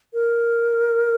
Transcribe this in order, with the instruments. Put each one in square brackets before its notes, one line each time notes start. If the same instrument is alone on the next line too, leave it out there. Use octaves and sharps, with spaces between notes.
[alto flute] A#4